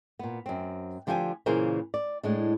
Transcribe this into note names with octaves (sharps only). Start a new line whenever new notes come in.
A#2 B3
F#2 C4
D3 F3 G4 C5 G5 G#5
A#2 C#3 E3 G#4 A#4 C5
D5
A2 G#3 D4